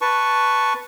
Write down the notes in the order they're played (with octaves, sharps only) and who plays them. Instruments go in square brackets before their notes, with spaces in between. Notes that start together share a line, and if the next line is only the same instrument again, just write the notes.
[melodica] B4 A5 C#6